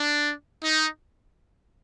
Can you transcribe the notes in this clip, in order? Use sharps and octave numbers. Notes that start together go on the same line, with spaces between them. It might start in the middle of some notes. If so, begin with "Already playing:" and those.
Already playing: D4
D#4